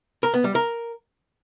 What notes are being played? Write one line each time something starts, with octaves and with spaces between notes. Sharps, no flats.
A#4
B3
G3
A#4